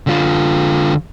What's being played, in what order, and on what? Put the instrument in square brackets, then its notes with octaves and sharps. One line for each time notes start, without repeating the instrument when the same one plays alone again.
[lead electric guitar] D3 F4